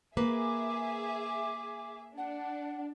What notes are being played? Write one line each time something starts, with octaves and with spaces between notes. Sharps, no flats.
A#3 G#4 B4 E5 D6
D4 F#5